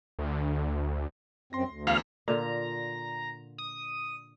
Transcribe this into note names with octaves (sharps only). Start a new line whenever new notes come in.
D2
F#2 C4 C6 A#6
D2
E2 F5
A#2 D3 F4 A#5
D#6